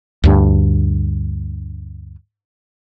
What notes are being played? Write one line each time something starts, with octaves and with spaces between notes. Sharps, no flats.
D2 G2